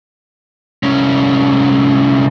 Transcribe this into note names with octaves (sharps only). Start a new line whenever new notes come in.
C2 C#4